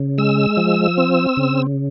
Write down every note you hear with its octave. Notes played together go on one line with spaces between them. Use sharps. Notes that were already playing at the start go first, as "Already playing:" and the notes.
Already playing: C#3
G#3 E6
F3
C4
C#3